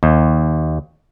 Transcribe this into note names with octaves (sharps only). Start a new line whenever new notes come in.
D#2